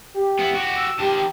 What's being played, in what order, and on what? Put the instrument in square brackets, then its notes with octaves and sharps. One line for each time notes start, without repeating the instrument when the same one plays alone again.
[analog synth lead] G4
[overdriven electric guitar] B3 E4
F#4 G4
[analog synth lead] E6
[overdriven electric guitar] D#3 A5 [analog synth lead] G4